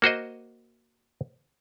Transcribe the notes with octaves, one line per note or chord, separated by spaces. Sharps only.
A#3 F#4 C5 D#5